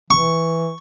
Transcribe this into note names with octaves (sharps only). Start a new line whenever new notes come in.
E3 C#6